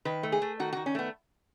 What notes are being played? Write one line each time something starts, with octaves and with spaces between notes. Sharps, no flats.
D#3 B4
A3
G#4
A3
D#3 F#4
D#3 F#4
C#4
A3 B3